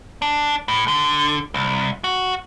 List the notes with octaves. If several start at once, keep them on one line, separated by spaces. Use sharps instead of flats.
D4
A2
D3
C2
F#4